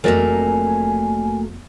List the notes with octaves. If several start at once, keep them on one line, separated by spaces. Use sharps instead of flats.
F1 F#3 A3 A#3 A#4 D5 D#5 G#5